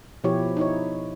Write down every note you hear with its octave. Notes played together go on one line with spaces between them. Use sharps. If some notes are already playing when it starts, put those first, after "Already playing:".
B2 F3 E4 G4 C#5
D#4 E4 C#5